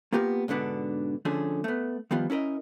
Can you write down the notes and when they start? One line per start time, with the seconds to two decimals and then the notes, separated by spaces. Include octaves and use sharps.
0.12 A#3 B3 F4 G4 A#4
0.48 G#2 B2 D3 B3 D4
1.25 D3 F3 A3 C#4 G#4
1.64 A3 B3
2.11 D#3 F3 G3 B3 F4
2.30 C#4 E4 A#4 D#5